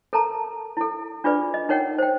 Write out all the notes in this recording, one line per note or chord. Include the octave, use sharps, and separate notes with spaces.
A4 A#4 A5 A#5
E4 A4
D4 F4 G#4 B4 D5
D#5
D#4 A#4 C#5 F#5 G5
C5 G5